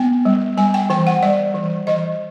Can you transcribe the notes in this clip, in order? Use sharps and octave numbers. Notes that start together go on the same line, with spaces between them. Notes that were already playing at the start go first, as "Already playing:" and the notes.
Already playing: B3 G5
G3
G3 G#5
G5
E3 G5
F#5
G3 D5
E3
E3 D#5